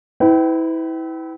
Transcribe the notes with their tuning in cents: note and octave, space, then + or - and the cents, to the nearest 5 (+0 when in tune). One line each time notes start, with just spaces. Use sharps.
E4 -25 B4 +35 G5 -30